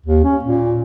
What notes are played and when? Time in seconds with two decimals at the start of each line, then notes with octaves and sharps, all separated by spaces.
0.06 D#2
0.24 C#4
0.44 A#2